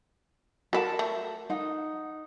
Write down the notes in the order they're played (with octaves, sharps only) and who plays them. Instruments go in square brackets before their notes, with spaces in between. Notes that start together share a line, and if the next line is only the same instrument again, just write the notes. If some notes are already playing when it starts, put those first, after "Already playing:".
[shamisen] F#4 B5 [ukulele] A4 A#4 A5
[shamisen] A3
[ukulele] D#4 F#5